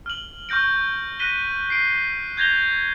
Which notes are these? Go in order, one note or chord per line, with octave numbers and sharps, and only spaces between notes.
F6 F#7
C#6 F6 G6 A#6 D7
F#6 A#6 B6 D#7 G7
C7 D7
G6 G#6 A#6 F7 G7